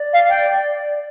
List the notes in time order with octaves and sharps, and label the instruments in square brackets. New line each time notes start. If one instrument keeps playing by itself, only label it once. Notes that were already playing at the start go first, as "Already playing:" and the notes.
Already playing: [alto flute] D5
[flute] F5
G5